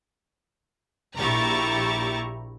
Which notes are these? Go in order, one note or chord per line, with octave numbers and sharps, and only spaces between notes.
A#1 E4 G4 A#5 C#6 A6